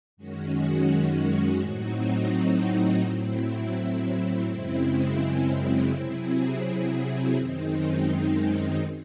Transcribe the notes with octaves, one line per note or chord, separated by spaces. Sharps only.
F#2 D#3 G#3 C#4 F#4
A2 F#3 C4 D#4 F#4
A2 F#3 C4 E4
F#2 C#3 G#3 C4 E4
C3 F#3 C4 E4 G#4
F#2 D#3 G#3 C4 D#4